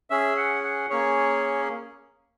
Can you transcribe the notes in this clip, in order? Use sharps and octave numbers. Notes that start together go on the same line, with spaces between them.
C#4 G#4 E5
F#5
F#5
A#3 C#4 G#4 C#5